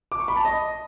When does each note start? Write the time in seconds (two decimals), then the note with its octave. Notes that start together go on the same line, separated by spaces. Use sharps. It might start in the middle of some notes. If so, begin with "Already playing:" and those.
0.12 D6
0.20 C#6
0.28 B5
0.36 A5
0.45 D#5